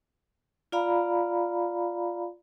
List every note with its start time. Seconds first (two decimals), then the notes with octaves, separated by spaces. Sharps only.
0.72 F4 D5 F5 A#5 B5